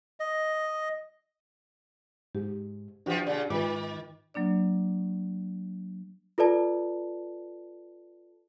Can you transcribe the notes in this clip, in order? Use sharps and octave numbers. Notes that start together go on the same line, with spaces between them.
D#5
G#2 G4
E3 F3 D4 F#4 G4
A#2 C#3 D5
G#2 D#3 F4 B4 D6
F#3 A#3 D4 D5
F4 A4 B4 D5 A5